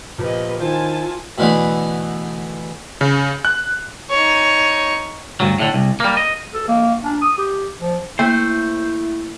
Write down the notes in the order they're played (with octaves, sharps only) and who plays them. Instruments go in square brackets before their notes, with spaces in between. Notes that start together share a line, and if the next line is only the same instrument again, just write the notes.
[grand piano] A#2 F3 [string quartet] G4 B4 D#5
[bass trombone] D#3 [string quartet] E4 G#5 A5 [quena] F4 [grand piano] C5
[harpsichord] B2 D3 E3 A3 B3
[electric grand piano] C#3
F#6
[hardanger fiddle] D#4 C#5
[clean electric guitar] D2 G2 F#3
A2 D3
C2
G3 A#3
D#5
[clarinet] A4
A#3
D4
D#6
G4
F3
[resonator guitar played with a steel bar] A3 [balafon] A#3 [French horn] E4 [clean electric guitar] C5